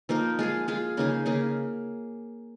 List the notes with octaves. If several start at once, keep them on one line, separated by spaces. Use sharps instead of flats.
F3 A#3 D#4 A#4
G#3 F4 G#4
G#3 F4 G#4
C#3 A#3 D#4 G#4
C#3 A#3 D#4 G#4